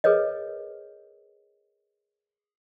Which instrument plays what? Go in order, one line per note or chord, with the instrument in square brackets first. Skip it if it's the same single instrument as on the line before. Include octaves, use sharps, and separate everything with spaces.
[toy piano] G#4 A#4 B4 C#5 D#5